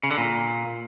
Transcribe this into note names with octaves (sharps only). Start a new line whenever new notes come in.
C#3
D3
A#2